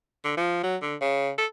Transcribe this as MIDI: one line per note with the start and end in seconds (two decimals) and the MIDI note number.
0.25 0.35 50
0.38 0.61 53
0.64 0.76 54
0.82 0.96 50
1.01 1.31 49
1.38 1.46 69